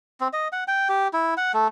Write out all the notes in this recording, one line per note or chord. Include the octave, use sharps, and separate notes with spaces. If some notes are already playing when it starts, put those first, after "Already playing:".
C4
D#5
F#5
G5
G4
E4
F#5
A3